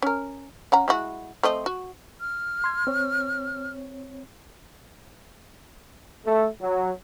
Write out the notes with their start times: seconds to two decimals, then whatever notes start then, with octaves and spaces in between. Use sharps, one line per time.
0.02 C#4 A#4
0.72 C#4 F#5 A#5
0.88 G#3 E4 F#4
1.43 A3 C4 D#5
1.66 F#4
2.21 F6
2.64 C6 G#6
2.87 C4 C#5
6.26 A3
6.60 F#3